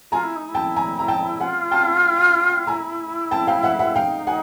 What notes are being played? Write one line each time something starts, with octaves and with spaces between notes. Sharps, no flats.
F4 G#5 A#5
E4
D#4
E4
G5 A5
G#5 A#5
A#5
G5 A5
F4 F#5 G#5
G5 A5
E4 G#5 A#5
G5 A5
F5 G5
E5 F#5
E5 F#5
D#4 F5 G5
F#5 G#5